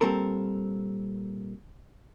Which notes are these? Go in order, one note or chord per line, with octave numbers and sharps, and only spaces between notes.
A#2 G3 C4 A4 A#4